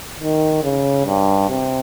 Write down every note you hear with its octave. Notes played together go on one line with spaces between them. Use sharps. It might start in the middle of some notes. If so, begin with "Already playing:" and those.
D#3
C#3
G2
C3